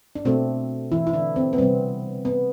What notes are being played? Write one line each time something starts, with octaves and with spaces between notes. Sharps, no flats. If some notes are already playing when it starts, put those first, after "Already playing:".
D4
B2 A3 C4
E3 E4
E4
D3 D4
C4
B3
C3 G3 C4
B3